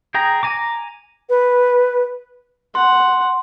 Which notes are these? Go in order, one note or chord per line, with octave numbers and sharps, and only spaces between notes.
G#4 G5 A#5
G#5 A#5 D6
B4
F#5 C6